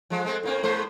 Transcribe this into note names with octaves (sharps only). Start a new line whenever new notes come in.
F3 G#3
G#3 A3 C4
A2 A#3 C4
A2 G#3 C5